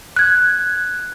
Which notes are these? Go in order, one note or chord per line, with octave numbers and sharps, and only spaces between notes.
F#6 G#6